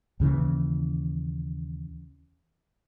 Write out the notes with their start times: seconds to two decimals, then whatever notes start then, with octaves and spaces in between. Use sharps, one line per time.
0.20 D#2 C#3 E3